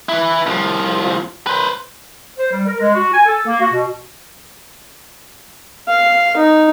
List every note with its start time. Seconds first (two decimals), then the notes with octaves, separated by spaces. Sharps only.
0.09 E4 B4
0.46 C2 F3
1.47 B4 C5
2.38 C5
2.52 G3
2.66 A#4
2.80 G#3
2.95 F#4
3.12 G#5
3.26 A4
3.45 A#3
3.60 F#4
3.72 B2
5.88 F5
6.36 D#4